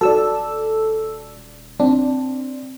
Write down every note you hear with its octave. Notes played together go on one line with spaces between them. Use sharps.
D#1 F#4 A4 D5 E6
C4 D4